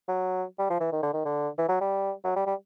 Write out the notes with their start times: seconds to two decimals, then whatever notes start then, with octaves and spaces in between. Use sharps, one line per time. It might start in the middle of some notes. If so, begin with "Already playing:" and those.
0.09 F#3
0.59 G3
0.70 F3
0.80 E3
0.92 D#3
1.03 D3
1.13 D#3
1.25 D3
1.58 E3
1.69 F#3
1.81 G3
2.24 F#3
2.36 G3
2.46 G3